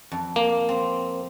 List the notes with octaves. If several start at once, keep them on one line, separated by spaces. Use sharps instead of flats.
F2
A#3
C4